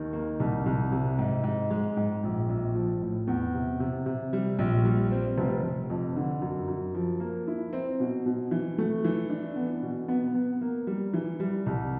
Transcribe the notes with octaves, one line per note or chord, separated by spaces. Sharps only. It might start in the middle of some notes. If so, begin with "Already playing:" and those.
Already playing: D#2 D#3
A#3
C2
C2
C3
G#2
G#2
G#3
G#2
A#1
A#1
F3
A2
E2
C3
C3
C3
G3
A#1
G3
C4
F1
F1
F2
D3
F#2
F#2
F3
A#3
E4
C4
B2
B2
E3
A3
E3
D4
B3
B2
B3
B3
A#3
G3
E3
G3
C2